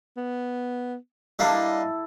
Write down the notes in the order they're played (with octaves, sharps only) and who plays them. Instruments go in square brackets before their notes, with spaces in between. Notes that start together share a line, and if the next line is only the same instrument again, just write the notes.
[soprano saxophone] B3
[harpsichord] G3 A#3 D4 [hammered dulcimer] E4 A4 [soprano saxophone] D#5